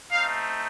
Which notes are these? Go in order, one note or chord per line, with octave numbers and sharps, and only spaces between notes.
A3 C4 D#4 F5